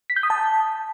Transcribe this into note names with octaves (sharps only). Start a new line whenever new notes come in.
B6
G6
D#6
A5